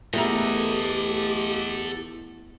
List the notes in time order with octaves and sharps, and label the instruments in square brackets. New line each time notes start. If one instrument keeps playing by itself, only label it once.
[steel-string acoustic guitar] E2 [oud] A3 A#4 [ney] G4 [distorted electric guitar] A4 D#5